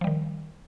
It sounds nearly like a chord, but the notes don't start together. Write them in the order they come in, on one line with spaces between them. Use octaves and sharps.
F3 G3 D#3